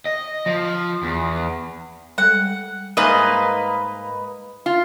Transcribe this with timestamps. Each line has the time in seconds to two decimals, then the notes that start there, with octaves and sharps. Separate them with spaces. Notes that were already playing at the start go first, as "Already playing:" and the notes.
0.06 D#5
0.46 F3
1.03 E2
2.18 G3 G#3 A4 F#5
2.97 G#2 A#3 B4 D#5 E5 G#5 D6
4.66 F4